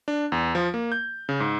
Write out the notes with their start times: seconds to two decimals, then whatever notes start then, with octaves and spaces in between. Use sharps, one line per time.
0.08 D4
0.32 E2
0.55 F3
0.74 A#3
0.92 G6
1.29 C#3
1.40 G#2